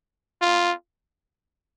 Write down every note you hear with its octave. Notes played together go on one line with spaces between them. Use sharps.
F4